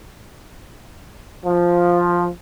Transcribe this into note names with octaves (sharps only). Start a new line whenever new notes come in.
F3